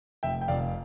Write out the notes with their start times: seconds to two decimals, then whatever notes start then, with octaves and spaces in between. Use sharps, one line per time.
0.23 F1 E5 G5
0.41 G5
0.48 F1 D5 F5